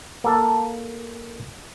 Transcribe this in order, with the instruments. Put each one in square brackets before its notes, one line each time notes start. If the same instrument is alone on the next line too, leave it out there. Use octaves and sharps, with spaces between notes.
[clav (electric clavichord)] A#3 A4